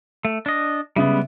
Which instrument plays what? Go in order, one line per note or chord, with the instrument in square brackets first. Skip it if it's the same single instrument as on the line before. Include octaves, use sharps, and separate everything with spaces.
[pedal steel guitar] A3
D4 D#5
[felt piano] C#3 E5 [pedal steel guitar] G3 G#3 B3